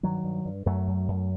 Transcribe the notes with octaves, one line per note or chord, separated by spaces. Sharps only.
G2 D#3 F#3
G2
G2
F#2 F#3 A3
F#2
F#2